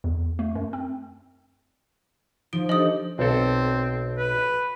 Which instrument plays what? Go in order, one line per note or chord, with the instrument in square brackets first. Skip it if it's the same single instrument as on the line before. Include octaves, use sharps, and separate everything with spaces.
[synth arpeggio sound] E2
A3
F#2
C4
[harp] F3 [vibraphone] D#4 [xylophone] D7
[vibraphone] D4 G4 A4 [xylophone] D#5 D#6
[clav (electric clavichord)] B1 A4 [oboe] C4
[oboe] B4